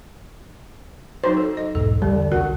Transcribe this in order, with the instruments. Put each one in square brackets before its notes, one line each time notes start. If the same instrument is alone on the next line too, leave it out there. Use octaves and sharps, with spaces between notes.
[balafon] F#3 D#4 F#4 [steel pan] C5
[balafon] A4
D#5
[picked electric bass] B1 E2 G#2 [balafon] A4
[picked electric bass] E2 [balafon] D3 [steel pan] G3
[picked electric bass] C2 D4 [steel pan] F#4 [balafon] A#4